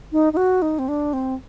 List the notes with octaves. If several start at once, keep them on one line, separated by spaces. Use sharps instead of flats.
D#4
D#4
F#4
D#4
C4
D4
C4